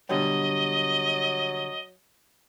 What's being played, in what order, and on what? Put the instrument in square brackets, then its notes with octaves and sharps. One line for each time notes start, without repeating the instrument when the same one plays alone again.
[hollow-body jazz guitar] B2 D3 G3 [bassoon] F#3 [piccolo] D#5